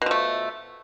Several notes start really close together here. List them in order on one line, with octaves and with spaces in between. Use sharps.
B2 F3 A3